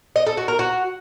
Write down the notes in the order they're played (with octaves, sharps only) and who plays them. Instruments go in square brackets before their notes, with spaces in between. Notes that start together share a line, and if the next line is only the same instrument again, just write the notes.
[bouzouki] D#5
A4
F#4
A#4
F#4